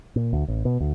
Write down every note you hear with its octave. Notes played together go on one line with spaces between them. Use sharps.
A#2
D2
A1
B2
D2